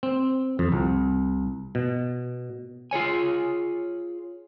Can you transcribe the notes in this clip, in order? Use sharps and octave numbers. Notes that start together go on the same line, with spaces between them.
C4
F2
C2
B2
F4 G#4 C#5 G#5